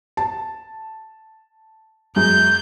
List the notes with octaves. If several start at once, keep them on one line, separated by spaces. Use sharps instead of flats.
A5
F#2 G#3 G6